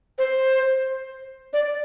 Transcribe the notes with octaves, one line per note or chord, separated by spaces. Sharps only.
C5
D5